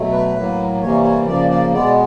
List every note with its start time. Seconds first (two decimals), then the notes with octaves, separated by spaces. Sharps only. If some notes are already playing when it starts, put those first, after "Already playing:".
Already playing: B2 F#3 A3
0.12 B4
0.35 A2 F#3 A#3
0.81 C3 E3 G3 A#3 C#5
1.04 C#5
1.26 C#3 F3 A#3 D5
1.50 D5
1.73 B2 G#3 B3 D5